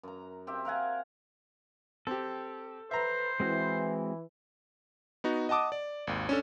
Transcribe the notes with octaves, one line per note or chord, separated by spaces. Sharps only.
F#2 A#5
C4 G4 E5 G5
A#4 F5 F#5 G#5
C4 G4 A4
B4 C5 E5 A#5
E3 G#3 C4 F#4
B3 D#4 F#4
D#5 F#5 A5 D6 D#6
D5
G#1 D#2
C#4 D4 A4